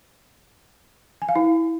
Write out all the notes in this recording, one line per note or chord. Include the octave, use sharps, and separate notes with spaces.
G#5
F5
E4